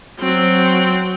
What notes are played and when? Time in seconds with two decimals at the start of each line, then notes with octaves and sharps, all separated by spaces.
0.20 F#3 C4